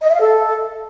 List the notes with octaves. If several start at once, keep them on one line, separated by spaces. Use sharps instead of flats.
D#5
E5
F5
A4